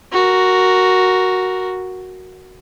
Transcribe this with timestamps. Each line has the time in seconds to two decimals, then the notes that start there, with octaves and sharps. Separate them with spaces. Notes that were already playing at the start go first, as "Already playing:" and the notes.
0.12 F#4 A#4